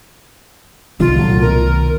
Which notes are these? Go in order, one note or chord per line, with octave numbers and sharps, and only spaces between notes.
C2 B2 D#3 G3 F4
A#2 F#3 A3
B2 D#3 A#4